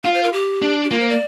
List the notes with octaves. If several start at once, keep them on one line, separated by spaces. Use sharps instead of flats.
F4 F5
C5
A#4
G4
D4
G4
A#3 F4
C5
D5